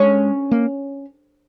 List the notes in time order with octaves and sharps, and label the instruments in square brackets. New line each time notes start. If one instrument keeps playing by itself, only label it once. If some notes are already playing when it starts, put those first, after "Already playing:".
Already playing: [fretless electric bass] G#3 [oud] C#4
[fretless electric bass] A#3